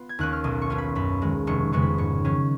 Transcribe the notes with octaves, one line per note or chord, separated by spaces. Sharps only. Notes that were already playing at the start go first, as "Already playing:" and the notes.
Already playing: B3 F4
G#6
D#2 D#3 A#3 C#4 F#6
F6
B1 D#6
C#6
B2 F#3 C#4 F4
B5
F#2 B5
D#3 G#3
F1 C#6
F2 C#3 G#3 B3 C#6
B5
G#2 C#6
D#3 F#3 C#4